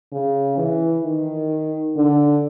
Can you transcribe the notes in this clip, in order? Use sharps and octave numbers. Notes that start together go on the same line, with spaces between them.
C#3
E3
D#3
D3